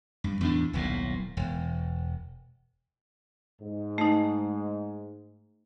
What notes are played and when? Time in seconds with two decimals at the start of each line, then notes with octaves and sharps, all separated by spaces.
0.24 G2
0.41 E2 A2 D4
0.73 D#1 B1 A2
1.37 E1
3.62 G#2
3.98 A3 D#4